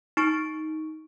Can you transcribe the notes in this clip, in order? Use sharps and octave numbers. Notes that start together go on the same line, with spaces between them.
D#4 C#6 D7